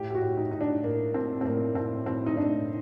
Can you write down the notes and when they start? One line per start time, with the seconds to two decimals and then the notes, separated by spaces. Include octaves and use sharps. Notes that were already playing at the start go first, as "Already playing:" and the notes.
Already playing: A2 G4
0.10 G4
0.15 F#4
0.22 A2
0.37 D#4
0.51 A2 D#4
0.61 D4
0.84 A2 A#3
1.14 A2 C4
1.41 C4
1.45 A2 A#3
1.75 A2 C4
2.06 A2 C4
2.26 D#4
2.37 A2 D4